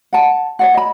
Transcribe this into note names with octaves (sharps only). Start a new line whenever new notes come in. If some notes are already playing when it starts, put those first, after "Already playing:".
F#5 A5
C#5 D5 F#5
D#5 B5